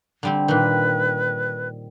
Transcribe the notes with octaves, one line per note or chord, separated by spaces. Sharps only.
D3 G3 C4
A#2 D#3 B4